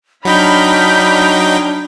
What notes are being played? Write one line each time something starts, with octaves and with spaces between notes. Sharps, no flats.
F#3 D4 D#4 G5 B5 F6 G6